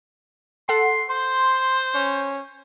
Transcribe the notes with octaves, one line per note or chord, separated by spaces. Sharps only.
A4 F#5 C6
C5 C6
C#4